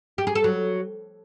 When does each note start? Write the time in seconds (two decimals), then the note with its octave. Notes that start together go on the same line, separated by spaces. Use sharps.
0.18 G4
0.27 G#4
0.35 A4
0.44 F#3